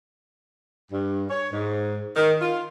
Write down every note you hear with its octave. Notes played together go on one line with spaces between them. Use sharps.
G2
C#5
G#2
D#3
F4